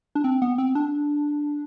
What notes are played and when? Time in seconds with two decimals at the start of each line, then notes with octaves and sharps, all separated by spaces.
0.15 D4
0.24 C4
0.42 B3
0.58 C4
0.75 D4